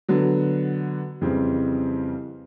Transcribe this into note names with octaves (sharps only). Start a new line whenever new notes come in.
D3 F#3 B3
F2 C#3 E3 G3 C4